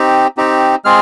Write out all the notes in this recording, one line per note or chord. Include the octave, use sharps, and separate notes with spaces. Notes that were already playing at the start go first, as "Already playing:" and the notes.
Already playing: C4 D#4 G4
C4 D#4 G4
G#3 C4 F4 G#4 F6